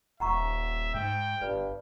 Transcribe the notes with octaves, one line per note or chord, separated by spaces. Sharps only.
D#1 E5 F#5 A#5 C#6
G#2 G5
G1 G2 B4